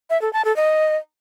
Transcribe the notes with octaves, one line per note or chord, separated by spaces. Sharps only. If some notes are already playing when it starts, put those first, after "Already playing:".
E5
A4
A5
A4
D#5